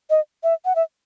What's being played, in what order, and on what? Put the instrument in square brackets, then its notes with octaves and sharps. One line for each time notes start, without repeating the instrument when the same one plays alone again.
[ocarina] D#5
E5
F#5
E5